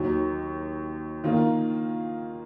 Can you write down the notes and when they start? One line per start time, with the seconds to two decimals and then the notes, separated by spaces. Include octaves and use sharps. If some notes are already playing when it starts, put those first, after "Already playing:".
Already playing: D#2 D#3 F#3
1.24 D#3 A#3 F4